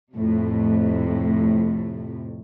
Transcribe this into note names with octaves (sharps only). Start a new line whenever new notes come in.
F2 A2 C3